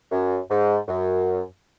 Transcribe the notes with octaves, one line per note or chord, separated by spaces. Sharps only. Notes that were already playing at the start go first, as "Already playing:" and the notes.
F#2
G#2
F#2